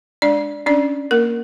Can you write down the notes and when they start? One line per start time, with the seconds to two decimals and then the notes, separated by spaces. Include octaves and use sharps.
0.22 G#3 D4 D5
0.66 C#4 D4 D5
1.11 A#3 A#4